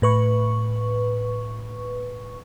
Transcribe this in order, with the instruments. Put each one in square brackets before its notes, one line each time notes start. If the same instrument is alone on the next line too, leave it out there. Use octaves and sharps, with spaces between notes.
[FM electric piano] A2 B4 C#6